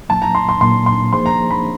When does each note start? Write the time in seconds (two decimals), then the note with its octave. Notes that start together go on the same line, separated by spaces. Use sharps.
0.09 A#2 F#3 A#3 A5
0.22 A#5
0.35 C6
0.49 C6
0.61 A#2 F#3 A#3 C6
0.86 C6
1.12 F3 A#3 D#4 G#4 C5 C6
1.26 A#5
1.51 B5